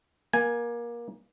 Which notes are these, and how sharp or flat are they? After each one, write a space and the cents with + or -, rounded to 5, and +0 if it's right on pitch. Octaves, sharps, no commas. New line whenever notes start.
A#3 +25 G#5 +0